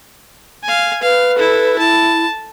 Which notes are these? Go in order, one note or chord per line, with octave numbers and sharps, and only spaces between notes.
F5 G#5
B4 F5
E4 A4
E4 A5